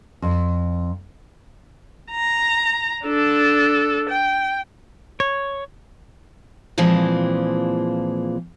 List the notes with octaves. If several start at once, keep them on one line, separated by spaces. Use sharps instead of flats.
F2
A#5
D4 A4
G5
C#5
A#2 E3 F3 G#3 C4